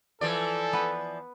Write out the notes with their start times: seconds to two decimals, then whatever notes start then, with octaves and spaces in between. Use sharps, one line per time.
0.21 E3 F3 A4 D5
0.73 B3 B4